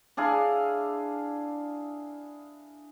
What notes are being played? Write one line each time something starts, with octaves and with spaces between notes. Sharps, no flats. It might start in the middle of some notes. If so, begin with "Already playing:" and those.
D4 E4 G#4 F5